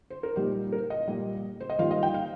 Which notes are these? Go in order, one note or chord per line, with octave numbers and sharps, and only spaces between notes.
C5
A#4
A#2 G3 D#4 G4
A#4
D#5
A#2 G3 A#3
C5
D#5
D#3 G3 A#3 F4 F5
D#5
G5
F5